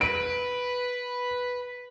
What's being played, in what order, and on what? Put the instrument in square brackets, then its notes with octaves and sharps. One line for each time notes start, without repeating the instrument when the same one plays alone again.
[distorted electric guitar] B4 [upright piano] D7